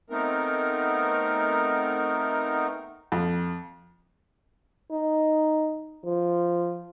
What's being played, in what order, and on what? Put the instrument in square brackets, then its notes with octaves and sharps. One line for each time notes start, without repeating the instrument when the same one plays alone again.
[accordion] A3 B3 C4 D#4 A#4
[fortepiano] F2
[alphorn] D#4
F3